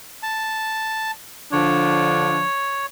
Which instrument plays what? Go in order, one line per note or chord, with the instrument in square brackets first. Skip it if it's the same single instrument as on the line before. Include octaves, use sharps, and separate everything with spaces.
[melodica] A5
[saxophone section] D3 F3 D4 [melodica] C#5